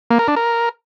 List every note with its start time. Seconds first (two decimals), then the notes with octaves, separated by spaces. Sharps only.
0.11 A#3
0.19 A#4
0.28 D4
0.36 A#4